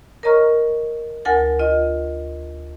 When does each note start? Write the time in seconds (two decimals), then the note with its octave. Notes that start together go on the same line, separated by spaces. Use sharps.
0.23 A#4 C#5 D#5 A#5 C#6 F6
1.25 D2 A#4 F#5 G#5 A6
1.59 F4 D#5